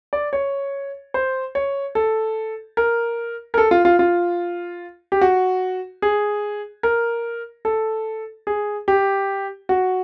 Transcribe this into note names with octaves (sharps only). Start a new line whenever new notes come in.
D5
C#5
C5
C#5
A4
A#4
A#4
A4
F4
F4
F4
G4
F#4
G#4
A#4
A4
G#4
G4
F#4